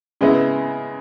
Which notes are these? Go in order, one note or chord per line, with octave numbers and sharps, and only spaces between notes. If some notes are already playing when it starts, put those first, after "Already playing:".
C#3 G#3 B3 E4